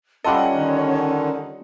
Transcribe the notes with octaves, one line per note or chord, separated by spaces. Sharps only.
G3 C#4 F4 A4 D#5 F#5
D3 D#3